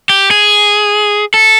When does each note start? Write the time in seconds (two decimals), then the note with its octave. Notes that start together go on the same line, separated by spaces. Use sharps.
0.09 G4
0.31 G#4
1.34 A4